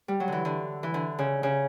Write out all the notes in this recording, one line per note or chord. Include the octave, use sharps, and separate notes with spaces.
G3
F#3
D3 E3
D3
E3
D3
C#3
C#3